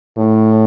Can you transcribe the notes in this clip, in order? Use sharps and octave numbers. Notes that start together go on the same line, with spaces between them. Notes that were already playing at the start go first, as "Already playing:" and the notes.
A2